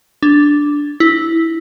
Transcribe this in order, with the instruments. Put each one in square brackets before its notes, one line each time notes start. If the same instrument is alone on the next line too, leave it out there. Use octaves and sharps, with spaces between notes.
[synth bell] D4
E4